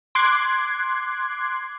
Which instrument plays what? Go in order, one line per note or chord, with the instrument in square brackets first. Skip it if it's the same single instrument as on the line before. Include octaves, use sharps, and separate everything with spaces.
[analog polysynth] C6 D6 F#6 G#6 C7